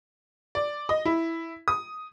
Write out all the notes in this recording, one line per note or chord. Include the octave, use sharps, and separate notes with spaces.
D5
D#5
E4
D#6